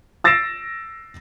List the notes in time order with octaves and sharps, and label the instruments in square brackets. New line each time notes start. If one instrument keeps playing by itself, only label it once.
[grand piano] E6 A6 A#6 C7 D7 E7